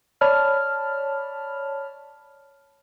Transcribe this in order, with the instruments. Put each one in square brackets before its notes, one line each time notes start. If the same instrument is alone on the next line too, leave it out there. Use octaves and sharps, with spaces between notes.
[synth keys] C#5 D5 A5 B5 F6